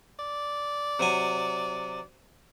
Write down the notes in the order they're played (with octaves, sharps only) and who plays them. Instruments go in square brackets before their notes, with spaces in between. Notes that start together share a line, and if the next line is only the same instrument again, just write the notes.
[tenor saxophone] D5
[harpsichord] C3 F#3 G#5